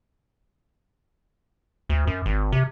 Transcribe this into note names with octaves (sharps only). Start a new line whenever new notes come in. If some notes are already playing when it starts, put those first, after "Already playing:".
D2
F#2
G#1
C3